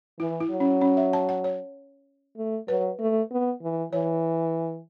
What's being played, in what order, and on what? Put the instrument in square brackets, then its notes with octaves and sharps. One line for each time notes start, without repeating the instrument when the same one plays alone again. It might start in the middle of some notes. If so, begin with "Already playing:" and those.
[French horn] E3 [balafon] E4
[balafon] E4
[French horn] F#3
[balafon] C#4
C#4
E5
A5
F#5
C#5
[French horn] A3
[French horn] F#3 [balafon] B4
[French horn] A3
B3
E3
[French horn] E3 [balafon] C#5